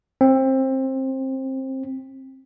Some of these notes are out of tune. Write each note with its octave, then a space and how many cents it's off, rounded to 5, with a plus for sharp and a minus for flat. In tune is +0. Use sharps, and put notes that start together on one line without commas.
C4 +20